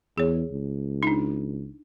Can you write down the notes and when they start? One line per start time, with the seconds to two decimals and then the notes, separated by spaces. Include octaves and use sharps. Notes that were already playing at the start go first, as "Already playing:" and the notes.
0.18 E2 G#4 C#5
0.51 C#2
1.03 D4 D#4